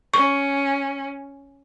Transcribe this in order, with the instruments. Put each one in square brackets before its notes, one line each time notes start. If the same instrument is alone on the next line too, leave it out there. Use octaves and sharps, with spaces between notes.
[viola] C#4 [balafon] C#6